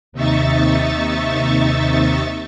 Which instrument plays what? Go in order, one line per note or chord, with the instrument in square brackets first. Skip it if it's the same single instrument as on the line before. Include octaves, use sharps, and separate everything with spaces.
[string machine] D#2 C3 D#4 E5 C#6 A6